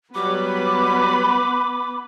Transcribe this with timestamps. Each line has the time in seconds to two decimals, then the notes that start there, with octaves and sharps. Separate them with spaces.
0.15 F#3 G3 B3 B4 B5 D6